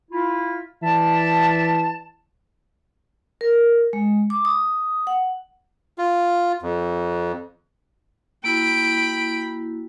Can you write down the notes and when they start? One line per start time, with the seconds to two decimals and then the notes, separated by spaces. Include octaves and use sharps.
0.11 E4 F4
0.83 E3 D5 E5 A5
3.41 A#4
3.93 G#3
4.30 D6
4.45 D#6
5.07 F#5
5.98 F4
6.62 F2
8.44 A#3 E4 F#4 G5 B5 D7